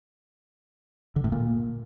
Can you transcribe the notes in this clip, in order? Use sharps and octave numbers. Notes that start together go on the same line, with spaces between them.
D3
A2
A#2